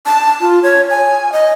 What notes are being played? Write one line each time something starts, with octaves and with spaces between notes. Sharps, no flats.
A5
F4
C#5
G#5
D#5